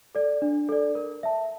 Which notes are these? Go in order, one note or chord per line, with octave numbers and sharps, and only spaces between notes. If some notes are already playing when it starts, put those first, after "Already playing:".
A4 D5
D4
A4 D5
A#4
E5 A5